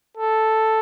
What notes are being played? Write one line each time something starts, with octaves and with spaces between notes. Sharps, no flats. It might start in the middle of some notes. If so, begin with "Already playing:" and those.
A4